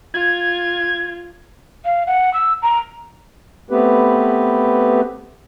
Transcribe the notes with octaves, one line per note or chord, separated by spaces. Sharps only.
F4 G#6
F5
F#5
E6
A#5
A3 B3 C4 G4 B4